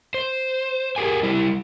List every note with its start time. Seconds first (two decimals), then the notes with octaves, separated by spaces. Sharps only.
0.14 C5
0.96 G4 G#4 A#4 G#5
1.23 G3 E4